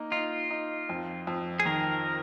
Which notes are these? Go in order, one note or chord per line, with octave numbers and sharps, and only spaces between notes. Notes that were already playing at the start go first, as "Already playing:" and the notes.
Already playing: A#3 D#4
D#4 F4
D#4
F2
F2
G#4
D#3 A#4